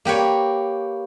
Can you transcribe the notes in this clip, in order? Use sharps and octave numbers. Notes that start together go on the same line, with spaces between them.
A#3 G4 B4 C#5